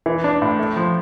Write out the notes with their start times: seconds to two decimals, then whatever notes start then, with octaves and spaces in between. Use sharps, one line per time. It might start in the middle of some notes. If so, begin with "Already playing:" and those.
0.06 E3
0.24 D4
0.42 A2
0.59 A3
0.76 F3